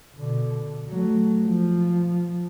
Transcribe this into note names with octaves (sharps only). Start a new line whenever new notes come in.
B2 D3
F#3 A3
F3